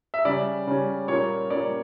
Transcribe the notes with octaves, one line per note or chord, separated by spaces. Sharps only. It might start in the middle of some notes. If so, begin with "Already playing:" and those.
E5
C#3 G3 C#4 D5
C#3 G3 C#4
A#2 G3 A#3 C#4 C#5
A#2 G3 A#3 C#4 D5